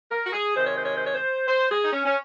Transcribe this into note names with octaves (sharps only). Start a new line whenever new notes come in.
A#4
F#4
G#4
C3 D#3 G#3 C5
C#5
C5
C#5
C5
C#5
C5
C5
G#4
D#4
C#4
C#4